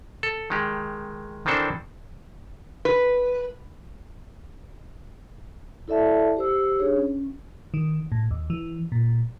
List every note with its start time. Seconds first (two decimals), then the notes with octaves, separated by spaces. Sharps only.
0.23 A4
0.50 D#3 G#3 G4
1.46 D#3 E3 C4 D4 A4 C5
2.85 B4
5.88 E4 A4 D5 E5 A5
6.37 G4 C5 E6
6.79 D4 D#4 G#4 C#5
6.96 C#4
7.74 D#3
8.12 A2
8.31 D#2
8.50 E3
8.92 A#2